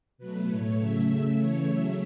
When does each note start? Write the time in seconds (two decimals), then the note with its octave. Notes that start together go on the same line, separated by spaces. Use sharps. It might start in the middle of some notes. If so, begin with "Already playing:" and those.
0.18 B2 F#3 A3 B4
0.48 A2 A3 C#5
0.77 C#3 F#3 A3 E5
1.08 C#3 A3
1.37 C#3 E3 A3 C#5
1.67 C#3 F#3 A3 E5